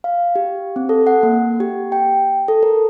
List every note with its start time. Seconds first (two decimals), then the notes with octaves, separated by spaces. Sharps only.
0.04 F5
0.36 G4
0.76 C4
0.89 A4
1.07 F#5
1.23 A#3
1.60 G4
1.92 G5
2.48 A4
2.63 A#4